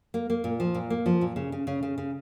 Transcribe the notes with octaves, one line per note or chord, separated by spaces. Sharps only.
A#3
A#3
A#2
F3
A#2
A#3
F3
A#2
C#3
C#3
C#3
C#3
C#3